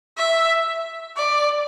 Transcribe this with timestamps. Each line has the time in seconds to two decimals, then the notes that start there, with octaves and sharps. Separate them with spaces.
0.17 E5
1.16 D5